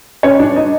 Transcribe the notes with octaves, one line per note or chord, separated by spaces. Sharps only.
C#4 C#5
D4 D5
D#4 D#5